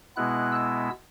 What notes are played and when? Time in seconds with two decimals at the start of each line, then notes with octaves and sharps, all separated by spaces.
0.16 B2 G#3 B3 E4 F#6
0.52 E6